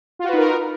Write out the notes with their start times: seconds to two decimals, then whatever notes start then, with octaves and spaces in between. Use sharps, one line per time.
0.19 F4
0.24 F#4
0.29 B4
0.33 D#4
0.38 A#4